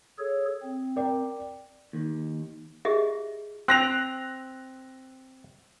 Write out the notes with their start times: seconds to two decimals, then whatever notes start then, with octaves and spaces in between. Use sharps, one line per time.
0.19 G#4 A4 C#5
0.62 C4
0.96 A#4 D5 G5
1.93 D#2
2.85 F4 G4 G#4 D#5 E5
3.68 C4 F#6 A#6 F7